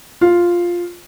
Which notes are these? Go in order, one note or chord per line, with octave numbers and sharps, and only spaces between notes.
F4